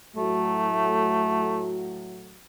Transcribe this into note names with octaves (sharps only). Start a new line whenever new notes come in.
A2 F#3 A3 F#4